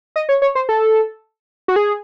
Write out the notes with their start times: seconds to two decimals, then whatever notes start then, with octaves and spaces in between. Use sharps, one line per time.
0.16 D#5
0.29 C#5
0.42 C#5
0.55 C5
0.69 A4
1.68 F#4
1.76 G#4